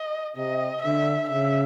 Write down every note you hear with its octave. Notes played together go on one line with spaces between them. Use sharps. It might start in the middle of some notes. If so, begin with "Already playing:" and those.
Already playing: D#5
C3 D#5
D3 E5
C#3 E5